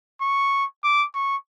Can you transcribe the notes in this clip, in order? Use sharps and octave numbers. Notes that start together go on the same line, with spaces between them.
C#6
D6
C#6